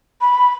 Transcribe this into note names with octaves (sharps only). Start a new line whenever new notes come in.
B5